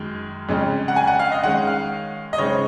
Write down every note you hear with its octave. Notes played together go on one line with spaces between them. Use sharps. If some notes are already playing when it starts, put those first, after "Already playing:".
Already playing: F#2 D#3 G#3
F2 C#3 G#3 C#4
F#5
G#5
F#5
F5
D#5
D#3 G#3 C#4 F#5
F5
D#5
C#3 G#3 C4 D#4 C#5